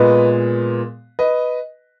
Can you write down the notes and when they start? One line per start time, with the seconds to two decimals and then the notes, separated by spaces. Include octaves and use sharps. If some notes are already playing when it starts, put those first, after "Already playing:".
Already playing: A#2 G#3 B3 B4 D#5
1.19 B4 D#5